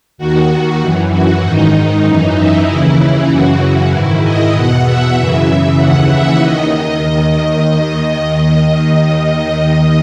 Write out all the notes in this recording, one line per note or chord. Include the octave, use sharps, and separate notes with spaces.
D#2 D#3 F#4
F#2 E3
F#4
G#2 D#3 D#4
D#4
F#2 E3
E4
D#2 C#3 E3 E4
F#2 C#3 E3 F#4
F#4
G#2 D#3 E4
D#5
E2 B2 F#5
E5
F#2 C#3 E3 E5
D#2 C#3 E3 F#5
E5
D#2 D#3 D#5